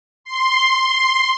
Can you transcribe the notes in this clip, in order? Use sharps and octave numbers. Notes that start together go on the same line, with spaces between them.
C6